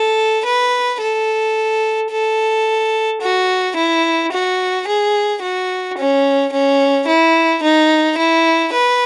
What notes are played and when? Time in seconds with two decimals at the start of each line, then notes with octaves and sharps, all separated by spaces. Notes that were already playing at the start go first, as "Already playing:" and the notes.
Already playing: A4
0.46 B4
1.01 A4
2.11 A4
3.22 F#4
3.77 E4
4.33 F#4
4.88 G#4
5.42 F#4
5.98 C#4
6.53 C#4
7.08 E4
7.63 D#4
8.18 E4
8.73 B4